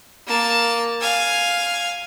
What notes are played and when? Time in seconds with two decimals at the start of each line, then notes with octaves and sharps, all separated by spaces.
0.27 A#3 A5
1.01 F5 G#5